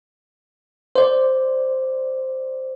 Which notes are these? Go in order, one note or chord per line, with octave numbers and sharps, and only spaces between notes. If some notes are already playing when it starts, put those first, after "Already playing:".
C5 D5